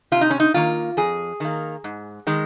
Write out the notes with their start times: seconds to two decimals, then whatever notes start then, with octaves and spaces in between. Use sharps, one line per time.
0.12 C3 F4
0.21 D#4
0.30 C#4
0.40 D#4
0.54 D#3 A#3 F4
0.97 F2 G#4
1.40 D#3 A#3
1.84 G#2
2.27 D#3 G#3